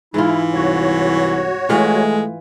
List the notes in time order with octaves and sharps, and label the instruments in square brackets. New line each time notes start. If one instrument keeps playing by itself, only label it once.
[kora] G#2 F4 [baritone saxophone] E3 [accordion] E4
[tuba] C2 [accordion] F#4 C#5
[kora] E3 F4 [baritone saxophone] G#3 [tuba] A3